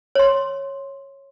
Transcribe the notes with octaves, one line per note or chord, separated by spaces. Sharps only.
C#5 C6